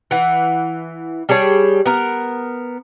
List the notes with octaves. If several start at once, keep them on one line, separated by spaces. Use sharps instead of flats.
E3 F#5
G3 G#4 C#5 A5
B3 A#4